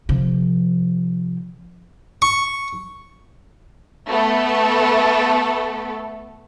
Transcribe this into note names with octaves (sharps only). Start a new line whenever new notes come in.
C3 F3
C#6
A3 B3 A4